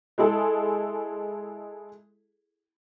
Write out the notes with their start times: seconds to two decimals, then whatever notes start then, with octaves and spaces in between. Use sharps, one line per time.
0.18 G#3 E4 G#4 A4